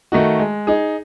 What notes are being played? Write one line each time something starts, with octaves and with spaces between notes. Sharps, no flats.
D#3 A3 D#4 F#4
G#3
D#4 G#4